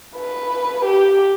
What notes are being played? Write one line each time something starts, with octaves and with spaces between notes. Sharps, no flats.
B4
G4